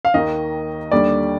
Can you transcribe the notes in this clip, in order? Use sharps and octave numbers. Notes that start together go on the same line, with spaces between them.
F5
D#2 D#3 A#3 D#4 D#5
D#2 D3 G3 D5